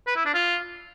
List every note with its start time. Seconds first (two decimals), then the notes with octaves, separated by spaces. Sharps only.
0.07 B4
0.16 E4
0.25 D4
0.34 F4